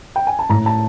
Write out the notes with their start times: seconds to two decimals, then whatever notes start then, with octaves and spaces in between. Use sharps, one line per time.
0.16 G5
0.27 G#5
0.39 A5
0.49 A2 A#5
0.66 A5